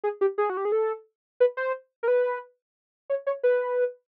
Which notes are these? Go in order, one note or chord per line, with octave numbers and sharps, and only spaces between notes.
G#4
G4
G#4
F#4
G4
G#4
A4
B4
C5
A#4
B4
C#5
C#5
B4